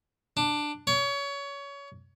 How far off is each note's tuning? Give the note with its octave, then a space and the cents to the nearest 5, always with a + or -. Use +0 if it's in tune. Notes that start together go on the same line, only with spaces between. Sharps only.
D4 +10
C#5 +25